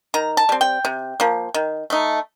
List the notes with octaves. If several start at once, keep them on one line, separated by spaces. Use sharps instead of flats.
D#3 A#5
A5
G3 C4
G5
C3
F3 A#3
D#3
A3 D#4